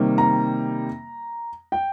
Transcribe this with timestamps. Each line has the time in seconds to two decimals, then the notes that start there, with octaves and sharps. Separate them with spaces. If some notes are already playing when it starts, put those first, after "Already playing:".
Already playing: C3 D#3 G3 A#3
0.18 A#5
1.72 G5